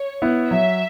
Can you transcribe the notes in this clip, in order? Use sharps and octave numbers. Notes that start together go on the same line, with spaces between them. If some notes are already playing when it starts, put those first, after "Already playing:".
Already playing: C#5
B3 E4
F#3 E5